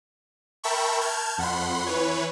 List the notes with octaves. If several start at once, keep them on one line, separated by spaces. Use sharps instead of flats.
A#4 E5 G5 A5 B5 C#6
A5 F6 G6 G#6
F2 F#5 B5 C6
E3 B4 C#5